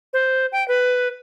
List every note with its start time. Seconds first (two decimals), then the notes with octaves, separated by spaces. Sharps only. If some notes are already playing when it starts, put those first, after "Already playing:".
0.13 C5
0.52 G5
0.68 B4